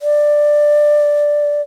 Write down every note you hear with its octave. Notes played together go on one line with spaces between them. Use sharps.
D5